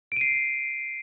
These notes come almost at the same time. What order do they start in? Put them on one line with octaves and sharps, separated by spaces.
D7 D#7 C7